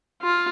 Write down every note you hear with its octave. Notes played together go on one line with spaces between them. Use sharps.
F4